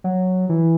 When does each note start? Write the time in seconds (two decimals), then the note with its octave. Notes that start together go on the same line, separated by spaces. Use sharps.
0.04 F#3
0.49 E3